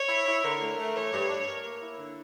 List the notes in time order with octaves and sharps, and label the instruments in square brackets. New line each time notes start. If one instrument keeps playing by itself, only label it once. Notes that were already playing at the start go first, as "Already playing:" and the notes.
Already playing: [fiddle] C#5
[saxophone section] E4
E4
[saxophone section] D3 [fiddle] A#4
[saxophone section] A3
A3
[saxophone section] E3 [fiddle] C#5
[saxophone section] G2
D4
A#4
A#3
E4
D3